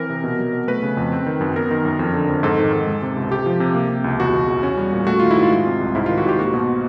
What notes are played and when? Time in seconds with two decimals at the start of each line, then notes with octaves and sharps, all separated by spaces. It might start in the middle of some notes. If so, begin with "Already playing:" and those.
Already playing: E3 C4 A#4
0.10 C3
0.24 B2
0.39 F#3
0.53 B2
0.68 A3 B4
0.83 C#3
0.97 F2
1.12 C4
1.26 D#3
1.41 F#2
1.55 B3 A#4
1.71 D#3
1.85 F#2
1.99 F2
2.14 D3
2.29 F2
2.43 G#2 A4
2.59 D#3
2.73 G#2
2.87 G#3
3.02 C3
3.17 C#2
3.31 C3 G4
3.46 F3
3.60 C3
3.75 A#3
3.89 C3
4.04 C#2
4.19 E2 F#4
4.33 B2
4.48 E2
4.63 C#4
4.77 G3
4.92 A#2
5.07 A3 F#4
5.19 D#3 F4
5.31 E4
5.36 G#2
5.43 F4
5.51 G#3
5.66 C3
5.81 C2
5.95 G#2 E4
6.06 D#3 F4
6.18 F#4
6.25 G#2 G4
6.39 A#3 F#4
6.54 B2